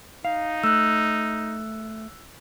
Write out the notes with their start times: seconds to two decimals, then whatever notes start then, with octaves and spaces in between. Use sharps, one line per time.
0.25 D#4 F5
0.64 A3 E6 F#6